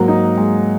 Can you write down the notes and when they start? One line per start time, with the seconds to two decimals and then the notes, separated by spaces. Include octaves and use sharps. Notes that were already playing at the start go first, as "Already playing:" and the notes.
Already playing: G#2 F#3 A#3
0.08 D#4
0.37 G#3